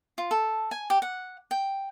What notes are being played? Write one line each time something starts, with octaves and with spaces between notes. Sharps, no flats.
F4
A4
G#5
G4
F#5
G5